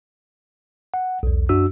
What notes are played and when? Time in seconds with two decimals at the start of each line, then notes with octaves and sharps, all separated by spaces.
0.94 F#5
1.23 B1 E2
1.49 F#2 D4 F#4 E6